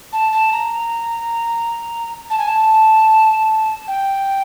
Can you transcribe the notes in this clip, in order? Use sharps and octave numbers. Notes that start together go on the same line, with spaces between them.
A5
A5
A#5
A5
G#5
A5
G5